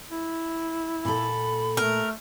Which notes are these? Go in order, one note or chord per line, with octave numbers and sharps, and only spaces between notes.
E4
A#2 A4 B5
A3 A#4